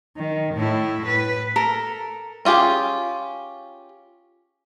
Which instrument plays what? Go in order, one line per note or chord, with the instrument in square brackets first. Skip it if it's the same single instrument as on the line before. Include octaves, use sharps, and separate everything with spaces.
[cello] D#3
A2 E4
B4
[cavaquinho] A4 A#4
[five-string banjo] C#4 F4 G4 G#4